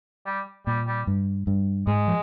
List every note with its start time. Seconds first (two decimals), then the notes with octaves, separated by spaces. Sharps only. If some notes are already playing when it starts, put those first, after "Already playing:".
0.26 G3
0.66 A#2 G3
0.87 G3
1.07 G2
1.47 G2
1.87 G#2 G#3
2.08 F3